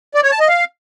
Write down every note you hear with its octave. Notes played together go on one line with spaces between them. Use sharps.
D5
C#5
A5
D#5
F5